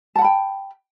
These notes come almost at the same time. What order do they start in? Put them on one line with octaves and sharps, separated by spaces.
A5 F#5 B5 G5